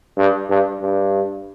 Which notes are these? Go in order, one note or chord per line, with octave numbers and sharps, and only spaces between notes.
G2
G2
G2